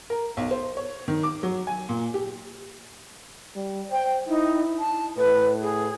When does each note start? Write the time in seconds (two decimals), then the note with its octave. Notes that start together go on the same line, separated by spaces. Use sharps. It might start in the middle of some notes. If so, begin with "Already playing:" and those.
0.10 A#4
0.37 B1
0.51 C5
0.77 C#5
1.08 D#3
1.23 D6
1.43 F#3
1.67 G#5
1.89 A#2
2.14 G4
3.56 G3
3.91 C5 G5
4.28 D#4 E4
4.79 A5
5.17 A2 B4
5.61 G#4